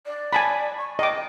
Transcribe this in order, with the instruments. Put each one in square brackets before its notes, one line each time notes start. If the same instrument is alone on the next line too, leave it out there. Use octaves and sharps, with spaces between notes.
[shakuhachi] D5
[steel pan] G#5 A5 B5
[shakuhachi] C#6
[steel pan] D#5 D6 [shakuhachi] G5